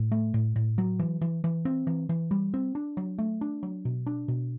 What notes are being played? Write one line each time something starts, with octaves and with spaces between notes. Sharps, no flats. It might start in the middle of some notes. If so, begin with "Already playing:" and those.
Already playing: A2
A3
A2
A2
F#3
E3
E3
E3
C4
E3
E3
G3
C4
D4
F#3
A3
D4
F#3
B2
D4
B2